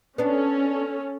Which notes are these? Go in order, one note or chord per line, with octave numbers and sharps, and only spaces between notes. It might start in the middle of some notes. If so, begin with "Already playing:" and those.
B3 C#4 D4 A4